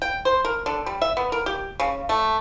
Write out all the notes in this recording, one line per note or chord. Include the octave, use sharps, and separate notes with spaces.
G5
C5
A#4
D3
G3
E5
B3
A#4
G4
C#3
A3